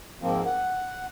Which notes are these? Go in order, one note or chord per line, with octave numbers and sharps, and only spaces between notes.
G#2 F3 A#3 C4
F#5